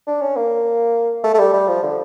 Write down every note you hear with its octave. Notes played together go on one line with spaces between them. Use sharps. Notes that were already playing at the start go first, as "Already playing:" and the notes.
D4
C#4
A#3
A3
A3
G3
G3
F3
D3